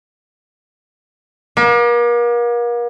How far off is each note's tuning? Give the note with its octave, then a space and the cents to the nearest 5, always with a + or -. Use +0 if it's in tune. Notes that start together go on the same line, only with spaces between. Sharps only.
A#3 +40